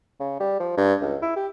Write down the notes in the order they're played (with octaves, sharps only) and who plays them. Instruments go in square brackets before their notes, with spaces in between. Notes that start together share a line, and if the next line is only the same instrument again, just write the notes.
[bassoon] C#3
G3
F3
G2
C#2
E4
G4